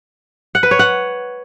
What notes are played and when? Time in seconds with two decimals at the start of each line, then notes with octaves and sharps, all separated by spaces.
0.55 F#5
0.63 B4
0.71 C#5
0.79 F#5